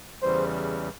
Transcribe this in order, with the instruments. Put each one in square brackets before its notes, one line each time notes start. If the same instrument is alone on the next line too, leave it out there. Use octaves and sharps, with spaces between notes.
[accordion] E2 C#3 E3 G3 [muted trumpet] C5